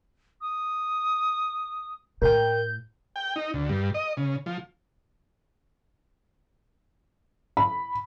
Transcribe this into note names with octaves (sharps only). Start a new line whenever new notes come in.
D#6
A2 A#4 G5 G6
G5
D#4
D2
G2
D#5
C#3
F3
B5